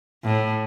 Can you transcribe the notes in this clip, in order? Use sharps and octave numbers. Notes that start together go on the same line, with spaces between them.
A2